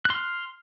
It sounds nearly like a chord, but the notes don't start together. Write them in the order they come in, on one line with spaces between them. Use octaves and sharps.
F#6 C6 F6